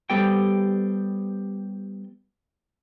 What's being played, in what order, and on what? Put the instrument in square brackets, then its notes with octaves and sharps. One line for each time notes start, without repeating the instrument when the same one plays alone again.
[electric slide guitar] G3 B3 G4 A4 C5 G5